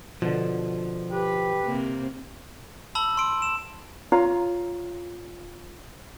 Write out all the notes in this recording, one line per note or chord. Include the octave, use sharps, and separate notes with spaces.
B2 D3 F3
G4 B4
C3 A#3 C4
A5 B5 E6 F#7
C6 D7
E7
F4 C#5 A#5